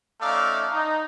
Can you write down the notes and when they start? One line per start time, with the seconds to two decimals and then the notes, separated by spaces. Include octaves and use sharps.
0.21 A3 C#4 D#4 D5 E5 F5
0.72 D#4